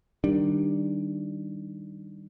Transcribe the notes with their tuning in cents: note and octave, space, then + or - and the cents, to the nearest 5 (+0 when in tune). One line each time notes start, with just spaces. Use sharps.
D#3 +0 G3 +0 D4 +5